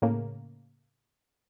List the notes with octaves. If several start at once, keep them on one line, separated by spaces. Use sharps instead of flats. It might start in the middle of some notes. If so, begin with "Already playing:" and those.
A2 C#3 A#3